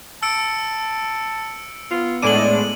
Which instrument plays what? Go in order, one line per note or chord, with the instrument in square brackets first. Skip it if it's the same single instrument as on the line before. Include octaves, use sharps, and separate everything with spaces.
[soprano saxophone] A5 [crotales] E6 C#7 D7
[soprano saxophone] B3 [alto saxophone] F4
[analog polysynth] A2 G#3 D4 [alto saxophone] D5 [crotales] D#7 F#7